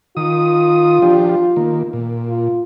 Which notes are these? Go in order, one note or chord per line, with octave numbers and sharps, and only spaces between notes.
D#3 F4 D#6
F3 D4 G4
D#3 A#3
A#2
F4